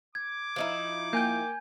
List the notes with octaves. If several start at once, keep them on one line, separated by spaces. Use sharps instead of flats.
D6 G#6
F3 D#4 E4
A#3 G5 G#5 G6